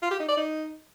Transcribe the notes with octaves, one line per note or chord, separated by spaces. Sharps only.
F4
G4
D#4
D5
D#4